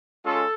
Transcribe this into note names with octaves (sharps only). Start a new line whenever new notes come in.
G#3 C#4 F4 A4